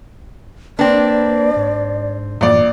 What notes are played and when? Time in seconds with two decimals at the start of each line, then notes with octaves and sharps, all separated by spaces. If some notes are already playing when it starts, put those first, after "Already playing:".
0.79 A#3 C4 D4 B4 D5
1.56 G#2
2.41 A#1 F#2 A2 E3 D5